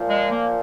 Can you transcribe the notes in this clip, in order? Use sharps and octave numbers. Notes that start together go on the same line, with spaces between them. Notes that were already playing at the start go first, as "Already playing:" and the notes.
Already playing: A#2 F3
G#3
A#3